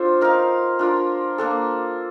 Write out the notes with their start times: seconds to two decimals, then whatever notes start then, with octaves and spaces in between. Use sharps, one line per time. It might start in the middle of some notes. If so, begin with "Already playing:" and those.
Already playing: D4 F4 A4 C5
0.21 D#4 A#4 F5
0.79 D4 F4 A#4
1.38 A#3 D4 A4